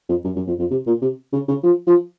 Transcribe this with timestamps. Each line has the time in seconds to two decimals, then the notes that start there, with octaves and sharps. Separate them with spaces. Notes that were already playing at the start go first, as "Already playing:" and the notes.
0.09 F2
0.25 F#2
0.36 F#2
0.48 F2
0.59 F2
0.71 C3
0.87 A#2
1.02 C3
1.33 C#3
1.48 C#3
1.64 F3
1.87 F3